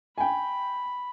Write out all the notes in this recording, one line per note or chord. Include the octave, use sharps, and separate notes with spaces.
G5 G#5 B5